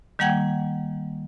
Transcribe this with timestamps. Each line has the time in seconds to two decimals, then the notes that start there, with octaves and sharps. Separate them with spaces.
0.19 D#3 G3 A#3 F#5 G5 G#6